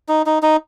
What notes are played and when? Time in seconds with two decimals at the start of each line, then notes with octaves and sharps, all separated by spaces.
0.08 D#4
0.26 D#4
0.43 D#4